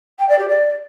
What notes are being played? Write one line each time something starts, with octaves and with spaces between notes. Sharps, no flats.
G5
D5
G4
D5